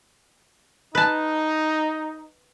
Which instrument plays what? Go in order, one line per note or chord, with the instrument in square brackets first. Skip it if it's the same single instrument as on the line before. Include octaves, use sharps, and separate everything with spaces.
[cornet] D#4 [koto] B4 A5